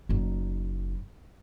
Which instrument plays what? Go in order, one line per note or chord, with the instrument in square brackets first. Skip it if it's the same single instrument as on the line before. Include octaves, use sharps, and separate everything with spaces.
[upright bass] F#1 D#4